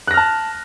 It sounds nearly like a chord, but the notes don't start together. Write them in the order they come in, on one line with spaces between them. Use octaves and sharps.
F#6 A#6 F6 A5